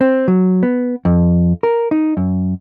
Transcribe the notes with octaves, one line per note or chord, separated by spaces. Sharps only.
C4
F#3
B3
F2
A#4
D#4
F#2